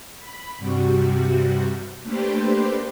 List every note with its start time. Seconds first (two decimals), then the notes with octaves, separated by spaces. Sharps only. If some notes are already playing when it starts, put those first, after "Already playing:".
0.18 B5
0.58 G2 C3 G3 F#4
2.03 A3 A#3 D4 G4 B4 C5